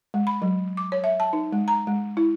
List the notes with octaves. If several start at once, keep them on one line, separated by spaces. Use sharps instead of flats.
G#3
B5
F#3
D6
C#5
E5
A5
D#4
G#3
A#5
G#3
E4